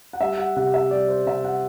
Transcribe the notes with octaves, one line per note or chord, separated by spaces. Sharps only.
F#5
G3 E5
F#5
C3 F#5
E5
G3 D5
C5
C3 E5
F#5